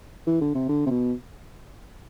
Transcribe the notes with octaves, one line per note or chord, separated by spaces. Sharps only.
E3
D3
C3
D3
C3
B2